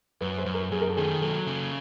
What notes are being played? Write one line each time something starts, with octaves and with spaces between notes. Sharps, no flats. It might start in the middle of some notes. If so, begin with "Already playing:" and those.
F#2 B4
C5
F#2
A#4
F#2 G#4
A#4
A4
D#3 G#4
F#3 A4
C#3